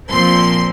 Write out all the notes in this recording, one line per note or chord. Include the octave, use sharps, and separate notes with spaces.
A#2 F3 C4 C6